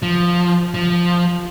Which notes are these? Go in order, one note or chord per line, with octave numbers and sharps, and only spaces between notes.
F3
F3